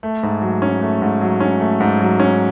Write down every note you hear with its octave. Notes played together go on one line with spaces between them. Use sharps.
A3
G#2
F#3
C#4
A3
G#2
F#3
C#4
A3
G#2
F#3
C#4